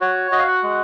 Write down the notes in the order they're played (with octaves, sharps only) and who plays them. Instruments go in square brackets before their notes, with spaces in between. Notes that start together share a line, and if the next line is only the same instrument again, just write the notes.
[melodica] F#4 C#5
F#4 D#5
F5
F#5
G#3